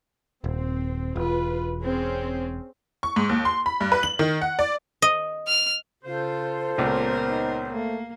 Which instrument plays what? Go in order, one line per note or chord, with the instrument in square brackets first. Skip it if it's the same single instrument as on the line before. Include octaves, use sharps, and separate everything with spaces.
[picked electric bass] D#1 [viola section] C4
[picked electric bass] E1 [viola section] F4 B4
[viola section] C4 C#4 G#4
[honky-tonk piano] C#6
G#2
D#2
C6
B5
G2
B4
F#7
D#3
F#5
D5
[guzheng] D#5
[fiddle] F6
[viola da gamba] C#3 F4 [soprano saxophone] A4 [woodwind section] C5
[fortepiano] C#2 A#2 [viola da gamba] B3 A#4
[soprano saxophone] D#4
[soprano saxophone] A3 [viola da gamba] A#3